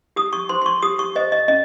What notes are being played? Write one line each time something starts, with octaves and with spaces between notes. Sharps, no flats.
G4 D#6
C#6
C5 C6
C6
C#6
G4 D#6
C#6
C5 D#5
D#5
C#4 D#5